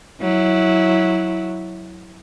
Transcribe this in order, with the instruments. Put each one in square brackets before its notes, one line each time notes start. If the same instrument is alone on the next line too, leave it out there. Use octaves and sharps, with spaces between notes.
[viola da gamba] F#3 E4